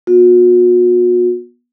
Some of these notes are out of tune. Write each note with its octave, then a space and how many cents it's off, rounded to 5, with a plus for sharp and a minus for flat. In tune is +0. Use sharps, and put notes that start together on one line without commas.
B3 -30 F#4 -45